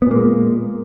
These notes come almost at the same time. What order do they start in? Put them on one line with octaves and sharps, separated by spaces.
B3 A#2 A#3 G#3